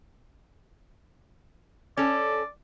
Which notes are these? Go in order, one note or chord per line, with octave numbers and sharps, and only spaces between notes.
C#4 A4 D5